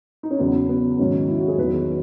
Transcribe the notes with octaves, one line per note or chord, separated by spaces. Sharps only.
D#4
C#4
E2 C#3 F#3 B3
B3
G#2 D#3 F#3 C#4
E4
F#4
G#4
E2 D#3 F#3 B4